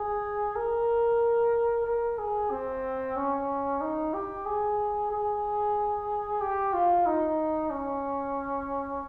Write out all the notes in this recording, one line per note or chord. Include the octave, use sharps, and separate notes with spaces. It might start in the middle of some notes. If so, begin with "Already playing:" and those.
Already playing: G#4
A#4
A#4
G#4
C4
C#4
D#4
G4
G#4
G#4
G4
F4
D#4
C#4